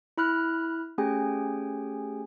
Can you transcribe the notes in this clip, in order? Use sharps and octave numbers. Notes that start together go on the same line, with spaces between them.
E4 B5 F6 F#6
A3 C#4 G4 G#4 G5 G#5